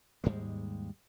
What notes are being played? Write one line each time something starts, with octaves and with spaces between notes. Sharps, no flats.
D#2 G#2 G3 G#3